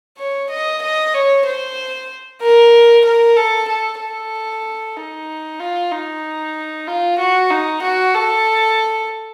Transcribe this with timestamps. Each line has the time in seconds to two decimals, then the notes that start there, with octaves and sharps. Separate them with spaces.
0.18 C#5
0.50 D#5
0.82 D#5
1.14 C#5
1.46 C5
2.42 A#4
3.05 A#4
3.37 A4
3.69 A4
4.00 A4
4.96 D#4
5.60 F4
5.91 D#4
6.87 F4
7.19 F#4
7.51 D#4
7.83 F#4
8.15 A4